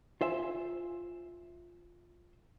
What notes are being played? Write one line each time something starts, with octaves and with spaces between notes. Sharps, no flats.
F4 C5 E5 G#5